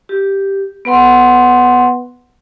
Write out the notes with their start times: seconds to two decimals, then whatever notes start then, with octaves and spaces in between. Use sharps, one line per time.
0.09 G4
0.85 B3 B4 F#5 C6